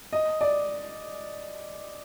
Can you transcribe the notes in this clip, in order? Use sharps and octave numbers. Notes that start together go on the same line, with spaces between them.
D#5
D5